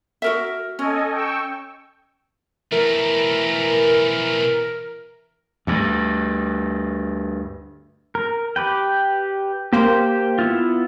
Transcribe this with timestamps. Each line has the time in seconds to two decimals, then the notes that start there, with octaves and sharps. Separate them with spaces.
0.22 F#4 A#4 E5
0.79 C#4 A4 D#5 G#5
1.12 G5 C#6 E6
2.72 B2 E3 A3 A#4
5.67 D2 G2
8.15 A#4
8.56 G4 B4 G5
9.73 A#3 G4 C5
10.39 B3 E4 F4